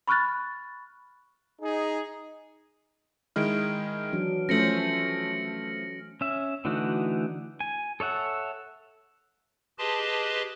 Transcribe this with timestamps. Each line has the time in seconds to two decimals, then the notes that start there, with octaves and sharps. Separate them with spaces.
0.07 B5 C#6 F6 F#6 A6
1.62 D#4 G#4
3.36 D#3 G#3 E4 F6 D7
4.12 E3 F#3 D4
4.49 F3 A3 C#4 C5 A#6 C#7 F#7
6.21 C#4 E5
6.65 D3 E3 A3 D#4 F#4
7.60 G#5
8.00 A4 C#5 E5 F#5
9.78 G4 G#4 B4 D#5 A5 C6